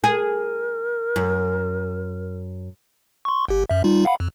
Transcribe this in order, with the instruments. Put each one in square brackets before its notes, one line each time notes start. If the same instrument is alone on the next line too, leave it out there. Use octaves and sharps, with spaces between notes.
[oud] G#4 [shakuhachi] A#4
[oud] F#2
[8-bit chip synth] C6 C#6
G1 G4
F#2 E5
G3 D#4 F4
F5 F#5 B5
F2